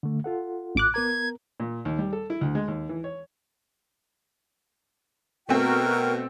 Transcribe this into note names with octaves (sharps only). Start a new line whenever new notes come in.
D3 A3
F4 A4 F#5
A1 D6 F#6
B3 A#4 A#5 G#6
A#2
D#2
G3
A4
E4
D2
G#3
D#2
E3
C#5
B2 A3 C4 F#4 A#4 G5